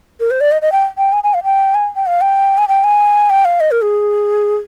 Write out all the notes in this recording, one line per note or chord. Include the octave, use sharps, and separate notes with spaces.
A#4
C5
D5
D#5
D#5
G5
G5
G#5
G#5
F5
G5
G#5
G5
F5
G5
G#5
G5
G#5
G5
F5
D#5
A#4
G#4